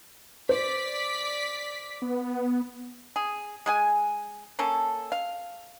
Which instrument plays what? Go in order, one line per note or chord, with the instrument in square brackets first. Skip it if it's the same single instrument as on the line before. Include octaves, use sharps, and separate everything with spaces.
[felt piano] C5 [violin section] D5 B6
[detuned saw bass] B3
[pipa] G#4
G#3 G#4 G#5
A#3 C#4 A4
F5